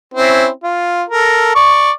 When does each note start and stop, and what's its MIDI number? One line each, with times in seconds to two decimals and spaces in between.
0.14 0.47 60
0.14 0.47 61
0.14 0.47 64
0.64 1.03 65
1.09 1.55 69
1.09 1.55 70
1.55 1.91 74
1.55 1.91 85